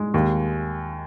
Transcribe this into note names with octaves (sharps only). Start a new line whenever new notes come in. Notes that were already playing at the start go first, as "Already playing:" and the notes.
Already playing: G#3
D#2